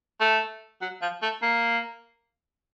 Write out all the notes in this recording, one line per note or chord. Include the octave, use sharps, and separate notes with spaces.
A3
F#3
F3
A3
A#3